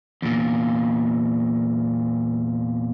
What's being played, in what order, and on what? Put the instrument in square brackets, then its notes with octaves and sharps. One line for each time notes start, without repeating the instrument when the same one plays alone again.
[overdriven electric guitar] E2 A#2